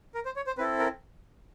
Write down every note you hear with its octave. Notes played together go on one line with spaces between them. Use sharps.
A#4
C5
C#5
C5
C4 E4 A4 B4
A#4